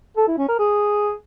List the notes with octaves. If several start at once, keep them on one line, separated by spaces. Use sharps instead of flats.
A4
E4
C#4
A#4
G#4